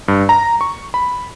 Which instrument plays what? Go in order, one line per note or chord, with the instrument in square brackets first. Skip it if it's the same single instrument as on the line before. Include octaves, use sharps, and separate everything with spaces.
[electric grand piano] G2
A#5
C#6
B5